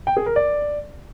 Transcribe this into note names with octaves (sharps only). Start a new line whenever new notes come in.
G5
G#4
A#4
D5